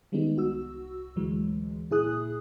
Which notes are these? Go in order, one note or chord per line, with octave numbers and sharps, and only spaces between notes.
D#3 G3 G#3 B3 D#4
C2 F#4 E6
D2 A2 E3 F#3 G#3
C#2 A#2 E4 G#4 D#6 F#6